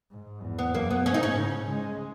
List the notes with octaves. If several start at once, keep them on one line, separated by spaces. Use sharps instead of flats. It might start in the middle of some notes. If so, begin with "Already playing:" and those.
G#2
E2
B3
F#2 A#3
B3
G#2 C#4
D#4
C#4
C#3
G#3